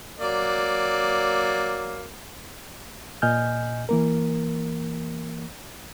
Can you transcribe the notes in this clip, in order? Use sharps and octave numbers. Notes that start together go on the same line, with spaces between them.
F#3 A#3 D5
A#2 D#5 G#5 F6 G6
E3 A#3 A#4